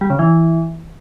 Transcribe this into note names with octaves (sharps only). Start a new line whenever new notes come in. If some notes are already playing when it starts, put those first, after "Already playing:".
G3
C#3
E3